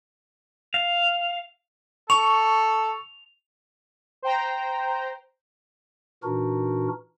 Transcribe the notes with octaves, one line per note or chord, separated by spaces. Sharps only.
F5
A4 C#6 F7
C5 G5 A#5
A#2 E3 D4 D#4 F#4 A#4